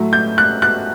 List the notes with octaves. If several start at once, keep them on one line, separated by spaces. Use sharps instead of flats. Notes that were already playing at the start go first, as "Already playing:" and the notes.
Already playing: A2 F#3 A3
G6
F#6
F#6